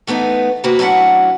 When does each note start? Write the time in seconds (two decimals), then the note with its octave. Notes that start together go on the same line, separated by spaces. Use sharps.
0.07 E3 A3 B3 D#4
0.64 C3 A#3 F#4 A#4 B4
0.79 F#3 A3 C#4 D4 E4 F#5